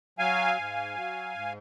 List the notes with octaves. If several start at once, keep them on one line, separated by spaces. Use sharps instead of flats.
F#3 F5 G#5
G#2
F#3
G#2